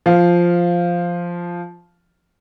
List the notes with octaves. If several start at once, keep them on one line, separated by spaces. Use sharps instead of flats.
F3 F5